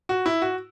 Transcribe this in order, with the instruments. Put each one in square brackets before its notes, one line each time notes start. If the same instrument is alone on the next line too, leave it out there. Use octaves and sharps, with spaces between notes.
[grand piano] F#4
E4
F#4